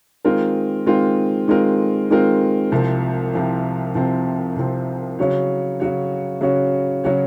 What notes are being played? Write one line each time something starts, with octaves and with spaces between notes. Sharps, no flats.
D#3 G#3 C4 F4 A#4
D#3 G#3 C4 F4 A#4
D#3 G#3 C4 F4 A#4
D#3 G#3 C4 F4 A#4
C2 C3 F3 C4
C2 C3 F3 C4
C2 C3 F3 C4
C2 C3 F3 C4
C#3 F#3 C#4 F#4 C#5
C#3 F#3 C#4 F#4 C#5
C#3 F#3 C#4 F#4 C#5
C#3 F#3 C#4 F#4 C#5